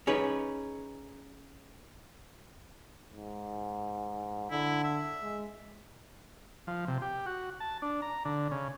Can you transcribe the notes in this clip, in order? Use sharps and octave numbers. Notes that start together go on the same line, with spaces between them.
C#4 D#4 G#4 B4
G#2
D3 E4
E5
G#3
F3
C3
G4
F#4
A5
D4
A#5
D3
C#3